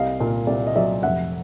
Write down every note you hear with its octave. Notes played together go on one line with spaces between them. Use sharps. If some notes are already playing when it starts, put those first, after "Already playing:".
Already playing: C2 D#5 F5
A#2
C2 D5 E5
D#5
F#3 D5 E5
F1 E5 F#5